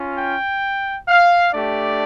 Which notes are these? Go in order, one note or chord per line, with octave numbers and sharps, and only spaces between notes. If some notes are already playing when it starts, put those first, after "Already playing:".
Already playing: C#4 F4
G5
F5
A3 D4 G4 D5